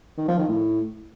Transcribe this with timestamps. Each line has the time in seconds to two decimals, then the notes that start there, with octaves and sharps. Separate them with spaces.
0.18 D#3
0.28 F3
0.38 D#3
0.48 A2